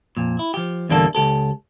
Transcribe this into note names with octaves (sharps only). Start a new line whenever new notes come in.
F2 A#2
E4
F3 G4
E2 A#2 D3 G3 A#3 A4
C#2 G4 A4